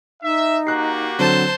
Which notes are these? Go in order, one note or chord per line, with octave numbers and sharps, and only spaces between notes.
D#4 E5
A#3 F#4 G4 A#5 F#6 C7
D3 F#3 C4 C5 A5